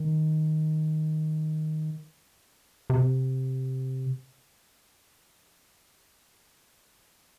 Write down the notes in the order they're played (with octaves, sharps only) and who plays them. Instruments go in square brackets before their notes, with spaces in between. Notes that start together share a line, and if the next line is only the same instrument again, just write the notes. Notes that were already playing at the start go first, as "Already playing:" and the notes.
Already playing: [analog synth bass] D#3
C3